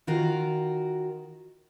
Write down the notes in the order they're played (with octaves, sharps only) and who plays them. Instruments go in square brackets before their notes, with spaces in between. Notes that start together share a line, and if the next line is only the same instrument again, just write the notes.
[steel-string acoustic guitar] D#3 F4 F#4 A#4